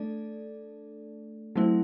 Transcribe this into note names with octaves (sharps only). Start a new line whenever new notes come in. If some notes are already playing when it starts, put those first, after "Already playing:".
Already playing: A3 D4 A4 D5
F#3 A3 C4 E4